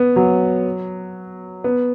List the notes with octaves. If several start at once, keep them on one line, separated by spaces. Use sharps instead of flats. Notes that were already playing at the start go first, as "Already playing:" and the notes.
Already playing: B3
F#3
B3